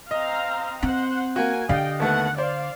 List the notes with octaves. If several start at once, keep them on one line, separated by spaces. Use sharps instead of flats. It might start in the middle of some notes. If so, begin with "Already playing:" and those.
C4 D#5 F5 A#5
C4 C5 F#5
A#3 F#4 G#5
D3 G4 D5 D#5 F5 G5
D#2 A3 B3 F#5
C5 D5 F5